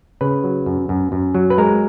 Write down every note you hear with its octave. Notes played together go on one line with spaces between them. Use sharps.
C#3 B4
F#3
F#2
F#2
F#2
F#3
B4
G#3 A#4